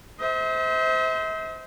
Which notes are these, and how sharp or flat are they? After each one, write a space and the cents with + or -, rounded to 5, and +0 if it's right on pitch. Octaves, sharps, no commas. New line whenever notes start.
C5 -15 E5 -45